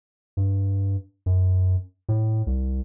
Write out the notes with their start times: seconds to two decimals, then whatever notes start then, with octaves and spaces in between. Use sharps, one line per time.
0.37 G2
1.26 F#2
2.09 A2
2.47 C2